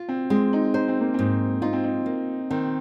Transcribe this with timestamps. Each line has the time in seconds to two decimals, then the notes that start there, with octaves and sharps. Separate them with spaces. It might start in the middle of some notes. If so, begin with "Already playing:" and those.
Already playing: F4
0.09 C4
0.30 G#3 C4
0.53 D#4
0.74 D#4 C5
0.88 C4
1.00 A#3
1.14 G#2 C4
1.62 D#4 F4
1.73 C4
1.84 D#4
2.06 A#3
2.50 D#3 C4